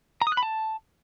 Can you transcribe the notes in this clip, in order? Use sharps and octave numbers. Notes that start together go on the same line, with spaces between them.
A#5
D#6
F#6
B5
A5